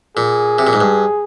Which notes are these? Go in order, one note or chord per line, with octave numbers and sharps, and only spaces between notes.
A#2 G#4
C3
A#2
G#2
G2